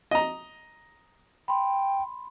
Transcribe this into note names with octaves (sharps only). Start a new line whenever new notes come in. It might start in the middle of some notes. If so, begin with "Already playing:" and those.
D#5 A#5
G5 B5 C6